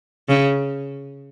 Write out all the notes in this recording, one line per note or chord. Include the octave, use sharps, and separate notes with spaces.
C#3